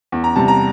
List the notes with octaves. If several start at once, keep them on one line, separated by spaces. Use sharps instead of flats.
E2
A#5
C3 G3 A5
A#5